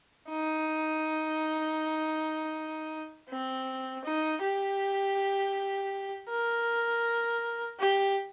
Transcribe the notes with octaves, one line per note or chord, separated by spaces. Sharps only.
D#4
C4
D#4
G4
A#4
G4